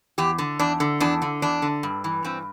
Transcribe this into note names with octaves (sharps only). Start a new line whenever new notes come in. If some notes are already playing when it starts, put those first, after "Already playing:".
E2 G4
D3
E2 D4
D3
E2 D4
D3
E2 D4
D3
G2
E3
G2 C4